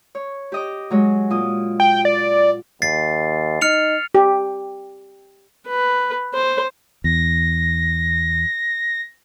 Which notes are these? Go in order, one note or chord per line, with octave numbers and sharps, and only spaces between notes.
C#5
G4 D#5 D6
F#3 G#3 C#5
A#2 F4 D#6
G5
D5
D#2 A6 C7
D#4 F6 C#7 F7
G4
B4
C5
E2 A#6